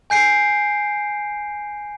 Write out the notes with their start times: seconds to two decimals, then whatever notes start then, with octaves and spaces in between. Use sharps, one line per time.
0.10 G#5 G6 C7 D7